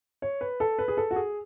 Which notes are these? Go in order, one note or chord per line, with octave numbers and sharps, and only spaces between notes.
C#5
B4
A4
B4
G#4
A4
F#4
G#4